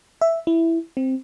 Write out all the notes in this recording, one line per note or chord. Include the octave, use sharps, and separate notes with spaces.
E5
E4
C4